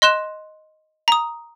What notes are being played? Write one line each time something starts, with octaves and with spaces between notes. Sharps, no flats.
D#5 C6 F#6 E7
A#5 D#6